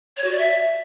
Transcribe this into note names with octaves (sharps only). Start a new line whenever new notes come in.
C#5
F#4
D5
E5